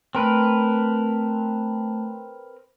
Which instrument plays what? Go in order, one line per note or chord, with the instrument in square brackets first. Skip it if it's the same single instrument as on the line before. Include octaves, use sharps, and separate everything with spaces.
[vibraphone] A3 A5 [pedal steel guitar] C4 A#4 B4